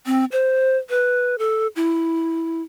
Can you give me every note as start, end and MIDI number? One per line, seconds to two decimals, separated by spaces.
0.06 0.25 60
0.32 0.77 72
0.90 1.38 71
1.38 1.67 69
1.76 2.62 64